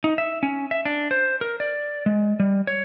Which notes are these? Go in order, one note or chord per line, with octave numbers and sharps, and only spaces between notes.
D#4
E5
C#4
E5
D4
C5
A#4
D5
G#3
G3
C#5